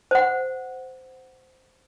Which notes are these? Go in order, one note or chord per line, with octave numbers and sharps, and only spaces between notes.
C5 F#5